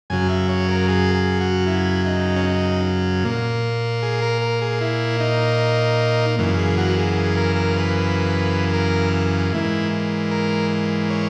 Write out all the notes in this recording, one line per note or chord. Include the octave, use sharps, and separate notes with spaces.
F#2 C#3 F#3 G#5
E5
C#5
A#4
G#4
G#4
F#4
E4
D#4
C#4
D#4
A#2 A#3
G#4
A#4
A#4
G#4
E4
D#4
F#2 C#3 E3 A#3
G#4
F#4
G#4
G#4
A#4
A#4
B4
A#4
G#2 E3 A#3 E4
A#4
C#5